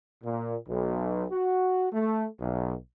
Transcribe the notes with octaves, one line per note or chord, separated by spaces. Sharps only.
A#2
B1
F#4
A3
B1